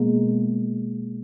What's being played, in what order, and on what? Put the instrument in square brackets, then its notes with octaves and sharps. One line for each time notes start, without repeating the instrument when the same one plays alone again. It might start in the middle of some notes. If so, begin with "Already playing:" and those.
Already playing: [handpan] B2 G#3 A#3